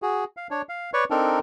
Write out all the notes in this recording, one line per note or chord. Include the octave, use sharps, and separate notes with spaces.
F#4 G#4
F5
D4 C#5
F5
B4 C#5 D5 C#6
C4 D4 D#4 A4 A#4